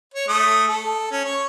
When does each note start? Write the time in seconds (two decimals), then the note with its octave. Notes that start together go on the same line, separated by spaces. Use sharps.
0.14 C#5
0.28 A3 D#6
0.68 A4
1.12 C#4
1.25 C#5 C#6